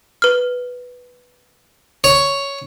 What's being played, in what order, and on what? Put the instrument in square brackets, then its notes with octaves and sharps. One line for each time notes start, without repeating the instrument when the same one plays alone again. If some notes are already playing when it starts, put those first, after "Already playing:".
[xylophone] B4 F6
[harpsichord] C#5